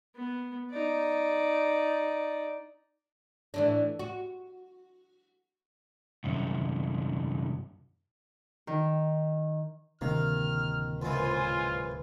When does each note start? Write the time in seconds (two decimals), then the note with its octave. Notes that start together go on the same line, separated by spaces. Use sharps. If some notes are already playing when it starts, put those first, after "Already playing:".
0.15 B3
0.71 D#4 D5
3.54 A2 E3 D4
3.99 F#4
6.24 C2 F#2
8.67 D#3
10.01 D1 C3 D#3 A#3 F6
11.02 C#2 F#2 E3 F4 C5 G#5